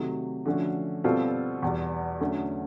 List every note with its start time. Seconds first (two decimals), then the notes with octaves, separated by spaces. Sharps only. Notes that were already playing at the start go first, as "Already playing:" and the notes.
Already playing: C3 D#3 F#3 A3
0.46 D3 F3 A3 C#4 F#4
1.04 B2 G3 C4 F4 A4
1.63 E2 B2 G3
2.21 D3 F#3 A3 C#4